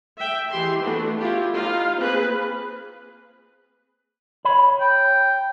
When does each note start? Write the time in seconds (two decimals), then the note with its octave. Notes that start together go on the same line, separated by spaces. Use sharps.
0.18 E5 G5
0.51 E3 G#3 G4 C6
0.82 A3 B3 D4 E4 F#4 A4
1.20 E4 F4 G4
1.55 D#4 F4 F5
1.97 A#3 C4 G#4 B4
4.45 C#5 B5
4.80 G5